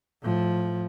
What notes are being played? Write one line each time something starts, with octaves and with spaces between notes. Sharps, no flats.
A2 F3